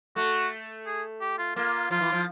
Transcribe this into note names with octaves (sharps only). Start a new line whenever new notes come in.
A3 F#4
G#4
G4
F4
A#3 F4
F3 F4
E3
F3